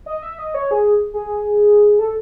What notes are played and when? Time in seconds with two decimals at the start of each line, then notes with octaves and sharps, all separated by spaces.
0.06 D#5
0.22 E5
0.39 D#5
0.54 C#5
0.71 G#4
1.14 G#4
1.99 A4